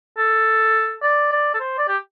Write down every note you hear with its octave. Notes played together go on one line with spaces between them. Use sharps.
A4
D5
D5
A4
C5
D5
G4